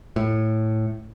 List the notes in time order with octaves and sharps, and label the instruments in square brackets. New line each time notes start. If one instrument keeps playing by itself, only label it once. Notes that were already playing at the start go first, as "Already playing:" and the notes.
[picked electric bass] A2